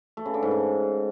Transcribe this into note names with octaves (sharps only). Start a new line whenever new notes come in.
A3
C#3
D3
G#2
C#3